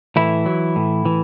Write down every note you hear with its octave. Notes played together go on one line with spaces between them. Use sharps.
A2 E3 E4
F#3
A2
E3